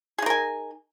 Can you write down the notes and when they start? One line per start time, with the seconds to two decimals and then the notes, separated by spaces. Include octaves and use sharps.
0.18 G#4
0.22 D#4
0.26 A#4
0.30 G#5